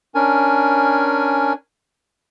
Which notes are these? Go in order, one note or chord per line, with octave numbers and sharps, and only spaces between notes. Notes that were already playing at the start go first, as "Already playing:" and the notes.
C#4 D4 A#4 G#5